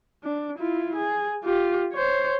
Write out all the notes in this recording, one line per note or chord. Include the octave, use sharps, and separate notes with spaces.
D4
E4 F4
G#4
F4 G4
C5 C#5